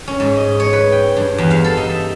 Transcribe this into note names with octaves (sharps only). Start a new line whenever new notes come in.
C#4
G#2
D#5
C#5
B4
G5
G2
E2
F5
A4
D#4
E5